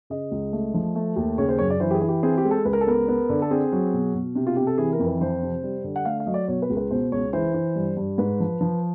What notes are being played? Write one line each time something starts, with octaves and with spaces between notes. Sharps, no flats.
C#3 D#5
C#2
A3
F3
A3
D#2
C#3 C#5
C5
F#2 C#5
D5
E3 C5
G4
G#4
E3
G4
C4 G#4
G4
G#3
A4
C#2 B4
A#4
A4
B3 A#4
B3
D3
A4
C4 G#4
F#3
B2
B2
C3
F4
C3 G4
A4
E3 G#4
A#4
F2
B4
F3 C5
C3
G3
D3
F#5
A3 F5
F5
F#3 D#5
D5
B2 C#5
B4
C#2
B4
B2 C5
C#2 C#5
E3 C5
E3
G2
G2
G#2 B4
F3
F3